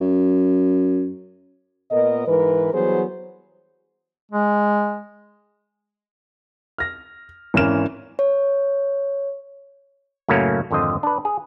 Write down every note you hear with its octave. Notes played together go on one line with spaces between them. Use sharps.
F#2
A#2 B3 A#4 D#5
G#2 E3 A#4 B4
E3 F#3 G3 B3 G#4 C5
G#3
F6 A#6
G#1 E3 C#4 A#4 F6 E7
C#5
F#2 A2 C#3 A3 A#3 C#4
G#1 F2 D3 C5 D#5
D4 B4
G#4